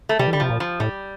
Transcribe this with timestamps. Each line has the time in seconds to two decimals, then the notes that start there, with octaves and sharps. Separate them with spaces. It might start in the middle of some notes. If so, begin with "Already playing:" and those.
0.09 A3
0.19 C3 G3
0.27 E3
0.33 D3 G3
0.40 C3 F3
0.50 A#2
0.60 F3
0.80 A2 G3